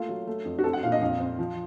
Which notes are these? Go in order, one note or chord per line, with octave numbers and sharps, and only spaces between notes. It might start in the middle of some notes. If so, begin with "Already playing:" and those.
Already playing: A3 A#3 F4
F#3
A3
F2
F#4
C4 A4
F#5
A#2 F5
D#5
F2 F5
C4
F3